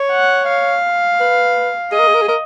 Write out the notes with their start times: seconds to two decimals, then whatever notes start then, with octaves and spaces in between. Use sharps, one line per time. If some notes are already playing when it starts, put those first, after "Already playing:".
Already playing: C#5
0.12 F#5
0.48 F5
1.20 B4
1.92 G#4 D#5
1.99 A#4
2.07 G#4
2.15 A#4
2.22 G#4
2.28 A#4